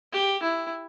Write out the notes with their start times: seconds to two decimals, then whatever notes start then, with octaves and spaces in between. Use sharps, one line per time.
0.12 G4
0.43 E4